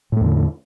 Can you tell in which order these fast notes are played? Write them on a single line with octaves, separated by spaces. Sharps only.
A2 A3 E2 D3